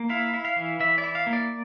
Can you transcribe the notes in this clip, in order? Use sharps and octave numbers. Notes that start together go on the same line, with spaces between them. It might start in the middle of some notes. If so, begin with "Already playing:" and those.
Already playing: A#3
E4 F5
E4
F5
E3
E3 E5
D5
E4
F5
A#3
D5